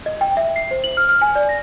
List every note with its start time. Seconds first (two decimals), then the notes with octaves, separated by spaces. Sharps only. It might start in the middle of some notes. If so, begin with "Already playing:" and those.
0.06 D#5
0.21 G5
0.37 E5
0.56 C7
0.71 C5
0.84 F#7
0.97 F6
1.09 F6
1.22 G#5
1.35 D5
1.49 A#6